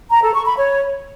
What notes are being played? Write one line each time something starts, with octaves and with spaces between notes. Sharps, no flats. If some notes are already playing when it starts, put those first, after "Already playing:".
A#5
A4
C#6
B5
C#5